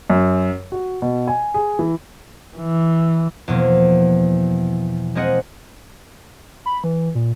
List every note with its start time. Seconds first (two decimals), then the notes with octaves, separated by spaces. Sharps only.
0.10 F#2
0.72 F#4
1.02 B2
1.28 G#5
1.54 G#4
1.79 E3
2.57 E3
3.48 E2 B2 F3 A#3
5.15 G#3 A#3 C4 G#4 D#5 F#5
6.66 B5
6.84 E3
7.15 A#2